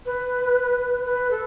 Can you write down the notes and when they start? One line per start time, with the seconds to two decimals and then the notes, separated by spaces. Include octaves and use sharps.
0.06 B4
1.06 B4
1.31 A4